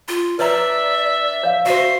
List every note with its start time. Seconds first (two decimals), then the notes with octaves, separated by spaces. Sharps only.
0.08 F4
0.39 D4 B4 C#5 D5 E5 A#5
1.43 C#5 F5
1.66 F#4 C5 E5 C7